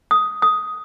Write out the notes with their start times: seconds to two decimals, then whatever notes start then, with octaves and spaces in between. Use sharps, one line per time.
0.11 D#6
0.42 D#6